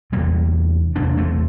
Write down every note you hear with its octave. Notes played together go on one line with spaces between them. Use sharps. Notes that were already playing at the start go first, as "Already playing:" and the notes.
E2 C3 G3 A#3
E2 C3 A#3 D4
A3 C4